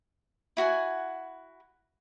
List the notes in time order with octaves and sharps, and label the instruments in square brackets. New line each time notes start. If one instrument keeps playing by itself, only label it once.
[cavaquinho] E4 F#4 F#5 G#5